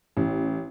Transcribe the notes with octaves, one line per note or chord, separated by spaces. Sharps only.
A1